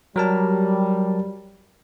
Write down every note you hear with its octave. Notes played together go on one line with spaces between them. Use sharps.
F#3 G3 A#4 A5